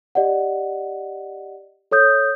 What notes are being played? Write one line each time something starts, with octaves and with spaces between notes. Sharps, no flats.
G4 D5 D#5 F#5
A4 C#5 D#6 G6